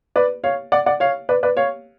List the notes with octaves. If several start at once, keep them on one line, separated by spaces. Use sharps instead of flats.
B4 D5
C#5 F5
D5 F#5
D5 F#5
C#5 F5
B4 D5
B4 D5
C#5 F5